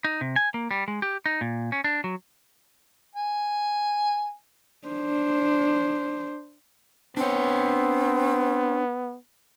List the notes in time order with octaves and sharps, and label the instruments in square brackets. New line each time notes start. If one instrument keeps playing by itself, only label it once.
[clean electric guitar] D#4
C3
G#5
A#3
G3
G#3
G4
D#4
A#2
C#4
D4
F#3
[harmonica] G#5
[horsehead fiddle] D4 C5
[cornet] B3 [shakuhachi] C4 [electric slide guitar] D4 C#5